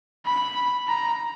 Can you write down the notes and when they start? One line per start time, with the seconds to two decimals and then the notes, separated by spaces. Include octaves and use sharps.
0.26 B5
0.88 A#5